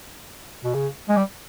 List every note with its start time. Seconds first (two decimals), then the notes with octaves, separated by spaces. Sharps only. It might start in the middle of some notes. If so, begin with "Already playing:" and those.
0.64 B2
0.74 C#3
1.09 G#3
1.17 G3